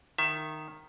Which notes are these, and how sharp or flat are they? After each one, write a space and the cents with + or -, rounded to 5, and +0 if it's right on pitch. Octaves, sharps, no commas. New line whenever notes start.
D#3 -10 E5 +15